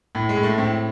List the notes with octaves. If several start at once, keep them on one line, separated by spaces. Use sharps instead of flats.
A2
G#3
A2
A3
A2 C4